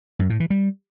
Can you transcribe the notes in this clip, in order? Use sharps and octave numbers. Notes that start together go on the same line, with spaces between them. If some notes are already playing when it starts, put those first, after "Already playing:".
F#2
A2
E3
G3